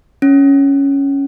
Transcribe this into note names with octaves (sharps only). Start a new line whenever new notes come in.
C#4